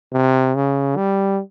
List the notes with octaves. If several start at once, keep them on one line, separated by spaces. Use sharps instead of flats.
C3
C#3
G3